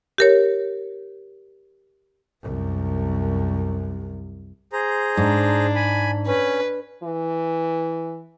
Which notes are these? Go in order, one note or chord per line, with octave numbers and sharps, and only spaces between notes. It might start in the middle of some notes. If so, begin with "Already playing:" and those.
G4 A#4 C#5
C2 F#2
G#4 C5 A#5
G#2 D4
G#5 B5
C#4 B4
E3